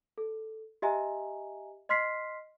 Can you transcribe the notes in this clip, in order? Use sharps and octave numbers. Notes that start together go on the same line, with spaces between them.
A4
G4 D#5 E5 G#5 A#5
D#5 C6 F6 B6 C7